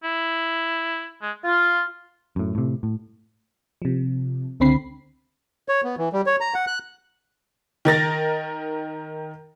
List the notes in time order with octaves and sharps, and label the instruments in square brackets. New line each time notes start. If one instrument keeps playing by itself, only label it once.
[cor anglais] E4
G#3
[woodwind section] F4
[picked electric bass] F#2 A2
A2 C3
A2
[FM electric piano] C3 F3
C#2 D3 C4 B5 C7
[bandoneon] C#5
B3
E3
G3
C#5
A#5
F#5
F#6
[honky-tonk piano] D#3 A#4 A6 A#6